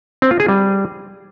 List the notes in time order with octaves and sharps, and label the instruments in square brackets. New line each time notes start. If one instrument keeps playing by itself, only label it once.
[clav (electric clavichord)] C4
F4
G#4
G3